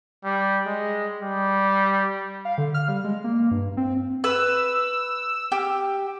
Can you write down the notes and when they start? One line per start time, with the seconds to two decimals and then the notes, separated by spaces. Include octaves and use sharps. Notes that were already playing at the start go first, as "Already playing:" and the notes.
0.24 G3
0.66 G#3
1.21 G3
2.45 F5
2.58 D3
2.74 F6
2.88 G3
3.04 G#3
3.24 A#3
3.51 G2
3.77 C4
4.24 B4 E6
5.52 G4